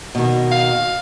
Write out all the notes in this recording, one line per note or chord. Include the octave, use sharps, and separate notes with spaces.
B2 D#3
F5